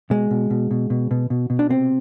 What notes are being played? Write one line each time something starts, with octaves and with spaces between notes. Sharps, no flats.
B2 G#3
B2
B2
B2
B2
B2
B2
B2
D4
C3 C4